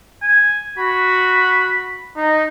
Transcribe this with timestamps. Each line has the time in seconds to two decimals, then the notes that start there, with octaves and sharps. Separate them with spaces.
0.23 G#5
0.78 F#4 B5
2.17 D#4